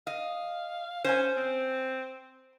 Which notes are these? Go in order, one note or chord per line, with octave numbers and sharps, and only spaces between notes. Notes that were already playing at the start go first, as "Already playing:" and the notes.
D#5 F5
C#4 C5 G#5
C4